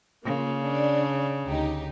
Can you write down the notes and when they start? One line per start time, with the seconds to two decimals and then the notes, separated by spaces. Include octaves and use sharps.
0.24 C#3 A#3 F4
0.64 D4
1.46 D2 D#4 G4